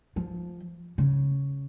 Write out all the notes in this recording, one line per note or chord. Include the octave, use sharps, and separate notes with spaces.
F3
C#3